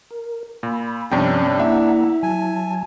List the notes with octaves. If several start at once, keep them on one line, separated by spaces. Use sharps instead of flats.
A#4
A#2 B5
G2 C3 F3 B3 C#4 D4 G5
A#3 E4 E5 F#5 A#5
F#3 G#5 A5